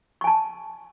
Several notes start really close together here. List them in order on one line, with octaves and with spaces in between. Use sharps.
C#6 G#5 A5